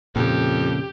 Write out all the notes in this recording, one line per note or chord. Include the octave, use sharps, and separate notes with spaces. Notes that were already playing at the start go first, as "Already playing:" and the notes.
F2 A#2 C#3 G4